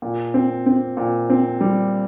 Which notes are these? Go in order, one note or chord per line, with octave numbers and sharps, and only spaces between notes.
A#2
C4
C4
A#2
C4
G3